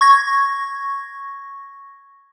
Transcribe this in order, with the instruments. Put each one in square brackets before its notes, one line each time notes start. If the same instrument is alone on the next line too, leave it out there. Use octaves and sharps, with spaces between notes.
[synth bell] C#6 G#6 A#6